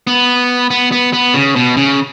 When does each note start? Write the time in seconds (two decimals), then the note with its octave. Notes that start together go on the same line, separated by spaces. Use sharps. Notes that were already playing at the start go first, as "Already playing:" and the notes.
0.07 B3
0.70 B3
0.92 B3
1.13 B3
1.34 C#3
1.56 B2
1.77 C#3